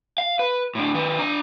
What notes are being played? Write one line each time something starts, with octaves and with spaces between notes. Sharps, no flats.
F5
B4
A2 D4
D#3 B4
D4 A#5